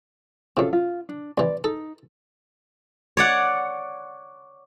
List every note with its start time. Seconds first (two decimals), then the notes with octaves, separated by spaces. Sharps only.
0.57 F#2 C3 F4 A4
0.73 F4
1.09 D4
1.38 C2 E3 D5
1.64 D#4 A4
3.17 C#5 D5 F#5